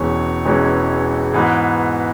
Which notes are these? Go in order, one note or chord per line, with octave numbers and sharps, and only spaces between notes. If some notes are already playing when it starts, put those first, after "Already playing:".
Already playing: E1 E2 E3 G#3 C#4 C#5
E1 E2 E3 G#3 C#4
G#2 E3 B3